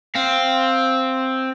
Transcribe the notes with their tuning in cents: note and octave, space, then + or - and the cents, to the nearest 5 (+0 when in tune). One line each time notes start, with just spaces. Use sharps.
C4 +0 F5 +0